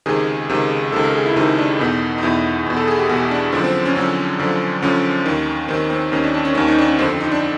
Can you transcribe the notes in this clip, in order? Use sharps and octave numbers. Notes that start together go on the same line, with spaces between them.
C#2 C3 D#3 G#4
C#2 C3 D#3
C#2 C3 D#3 A4
A#4
G#4
E4
C#2 C3 D#3 D#4
D4
E2 B2 D#4
D#4
E2 B2 E4
E2 B2
A4
G#4
G4
E2 B2 F#4
G4
D4
F#2 D3 F3 C4
C4
C#4
F#2 D3 F3 C4
F#2 D3 F3
F#2 D3 F3 C#4
D#2 D#3
D#2 D#3 C4
C4
D#2 D#3 C#4
D4
D4
C#4
D#2 D#3 C#4
D#4
D4
C#4
F2 D3 F3 C4
C4
D#4
D4